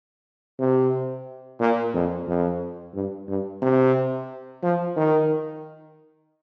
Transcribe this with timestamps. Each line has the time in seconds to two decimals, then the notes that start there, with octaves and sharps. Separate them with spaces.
0.59 C3
1.60 A#2
1.94 F2
2.28 F2
2.95 G2
3.28 G2
3.62 C3
4.63 F3
4.97 D#3